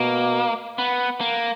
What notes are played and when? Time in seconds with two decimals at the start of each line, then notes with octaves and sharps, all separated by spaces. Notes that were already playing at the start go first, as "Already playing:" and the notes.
Already playing: B2 A#3
0.78 B3
1.21 A#3